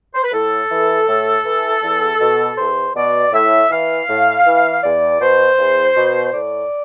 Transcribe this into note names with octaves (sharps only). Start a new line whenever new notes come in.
C5
B4
A2 A4
E3
A2
E3
E2
B2
E2 C5
B2 D5
A2 E5
E3 F5
A2
E3
E2 D5
B2 C5
E2
B2
A2 D5